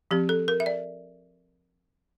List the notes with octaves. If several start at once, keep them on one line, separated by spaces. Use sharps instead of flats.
F3 C4 G4
A4
A#4
E5
D5